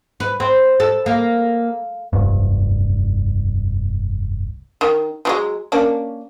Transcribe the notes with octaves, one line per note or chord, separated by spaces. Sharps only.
B4
C4
A4
A#3
F1 C2 G2
D#3
F3 F#3 G#3
A#3 C#4 D4